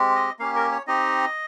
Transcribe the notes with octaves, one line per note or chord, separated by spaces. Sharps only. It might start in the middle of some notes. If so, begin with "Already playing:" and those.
Already playing: G#3 C4 G4
D#5
A#3 C#4 G4 F5
A#4
C#5
C4 D#4 G4 D#5